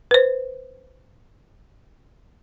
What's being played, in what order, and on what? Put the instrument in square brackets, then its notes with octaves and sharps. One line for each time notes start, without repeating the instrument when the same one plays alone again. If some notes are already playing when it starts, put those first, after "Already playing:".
[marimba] B4 C5